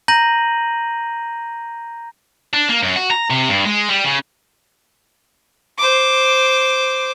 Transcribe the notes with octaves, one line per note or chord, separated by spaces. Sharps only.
A#5 G6 A#6 D#7 F#7
D4
A#3
F#2
F#4
A#5
C3
G2
G#3
G3
C#3
C5 D6